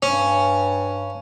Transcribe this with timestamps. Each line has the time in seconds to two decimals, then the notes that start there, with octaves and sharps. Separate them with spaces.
0.03 G2 C#4